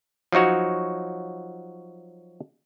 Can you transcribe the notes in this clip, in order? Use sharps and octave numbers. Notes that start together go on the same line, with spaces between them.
F3 F#3 D#4 F#4 C#5